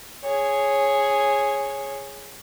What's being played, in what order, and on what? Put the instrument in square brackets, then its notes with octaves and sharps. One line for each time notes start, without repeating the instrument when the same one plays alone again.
[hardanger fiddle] G#4 C#5